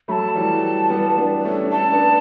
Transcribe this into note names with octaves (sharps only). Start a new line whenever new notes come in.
F#3 A3 A5 B5
E3 G3
G3 B3
B3 D4
A3 C#4
D4
A3 C#4 A5
B3 D4